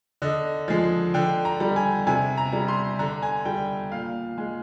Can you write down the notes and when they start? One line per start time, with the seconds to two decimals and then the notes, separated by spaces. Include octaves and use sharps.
0.22 D3 D#5
0.68 F3 G#3
1.14 D3 G5
1.45 A#5
1.60 G3
1.76 G#5
2.07 C3 G#5
2.38 A#5
2.53 G3
2.68 C6
2.99 D3 A#5
3.22 G#5
3.45 G3 G5
3.91 A#2 F5
4.38 G#3